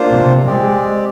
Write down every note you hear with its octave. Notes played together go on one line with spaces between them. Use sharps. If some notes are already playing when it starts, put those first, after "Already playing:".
Already playing: A#3 D4 F4 C5
C3
G#3 C4 G4 D5